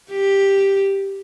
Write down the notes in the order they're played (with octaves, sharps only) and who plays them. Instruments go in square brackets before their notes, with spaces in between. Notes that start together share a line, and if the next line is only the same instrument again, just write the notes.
[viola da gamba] G4